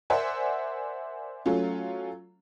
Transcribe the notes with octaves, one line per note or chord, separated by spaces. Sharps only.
A#4 C5 D5 E5 F#5 G#5
F#3 A3 C#4 F4